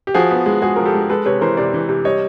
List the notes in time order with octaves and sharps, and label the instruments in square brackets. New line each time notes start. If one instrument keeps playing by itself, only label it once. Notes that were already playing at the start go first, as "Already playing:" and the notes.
[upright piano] G4
F3 F#4 G#4
B3
G#3
G#3 F#4 G#4
F3 A#4
G4 A4
G#3
G#3 A4 B4
C3 B4 C#5
E3 A#4 C5
C3 C5 D5
E3
C3
G3 C#5 D#5